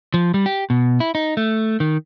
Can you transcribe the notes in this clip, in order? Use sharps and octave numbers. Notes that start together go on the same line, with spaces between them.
F3
G3
G4
B2
E4
D#4
A3
D#3